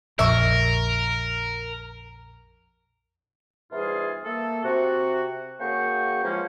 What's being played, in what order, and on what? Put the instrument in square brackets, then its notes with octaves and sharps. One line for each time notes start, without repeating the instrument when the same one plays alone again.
[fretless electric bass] A#1 F2 A#2 [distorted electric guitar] A#4 [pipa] E5 C#6
[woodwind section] E2 G#2 E3 G3 F4 G#4
A3 A#3 A4
C3 F#4
C#3 A#3 F#4 G#4 G5 C#6
C#3 E3 F3 G#3 A#3 C#4